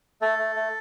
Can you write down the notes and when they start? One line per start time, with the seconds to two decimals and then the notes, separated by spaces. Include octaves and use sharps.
0.21 A3 A4
0.38 A3
0.55 A3